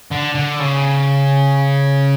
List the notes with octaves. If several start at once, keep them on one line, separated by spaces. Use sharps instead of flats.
D3
D3
C#3